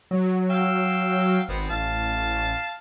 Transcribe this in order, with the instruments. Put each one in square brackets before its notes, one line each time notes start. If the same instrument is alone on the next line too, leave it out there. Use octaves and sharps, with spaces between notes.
[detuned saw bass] F#3
[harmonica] F5 G5 E6
[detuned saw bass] G#1 [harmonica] B3 C4
[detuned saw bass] A1 [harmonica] F5 A5